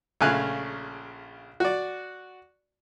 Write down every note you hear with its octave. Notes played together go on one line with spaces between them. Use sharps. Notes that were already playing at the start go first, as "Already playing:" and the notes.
A#1 C#3 A3 F5 G#5 F#6
F#4 D5